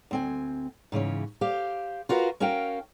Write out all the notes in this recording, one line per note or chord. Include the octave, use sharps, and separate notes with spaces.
D2 C4 G#5
G#2 C#3 E3 C#4
G4 C5 F5
F4 F#4 A#4 B4 F5
C#4 F#4 A#4 F5 G5